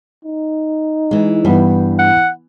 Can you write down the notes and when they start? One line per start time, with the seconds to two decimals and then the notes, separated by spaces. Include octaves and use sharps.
0.25 D#4
1.11 E3 G#3
1.45 G2 E3 G3 B3 E4
1.99 F#5